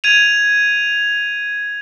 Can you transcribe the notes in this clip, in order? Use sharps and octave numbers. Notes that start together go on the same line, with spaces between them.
G#6 D#7 F7